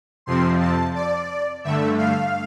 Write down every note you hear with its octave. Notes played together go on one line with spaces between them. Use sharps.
F2 C3 F3 C4 C6
A5
D5
G2 D3 A3 E5
F5